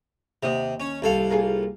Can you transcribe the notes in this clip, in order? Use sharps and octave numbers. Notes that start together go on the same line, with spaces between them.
D#2 C3 D#5
C#4
C2 A4 F5
A#3 F4 G#4